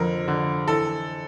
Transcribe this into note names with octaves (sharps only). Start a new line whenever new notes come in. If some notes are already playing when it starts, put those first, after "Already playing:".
Already playing: F2 D3 A#4
D3
E3 A4